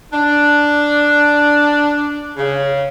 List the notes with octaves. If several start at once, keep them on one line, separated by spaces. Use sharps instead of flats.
D4
C#3